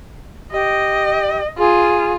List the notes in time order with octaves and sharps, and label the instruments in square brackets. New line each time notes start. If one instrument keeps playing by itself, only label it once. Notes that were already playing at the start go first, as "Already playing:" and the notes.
[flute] G4 [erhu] D#5
[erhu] F4 [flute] G#4